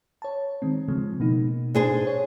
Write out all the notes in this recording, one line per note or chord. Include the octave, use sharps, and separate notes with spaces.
C#5 A5
D#3 G#3 C4
C#3 F3 G#3
B2 A#3 D#4
D4 G#4 C5
C#5